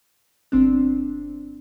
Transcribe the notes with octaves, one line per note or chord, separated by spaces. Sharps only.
G1 C4 D4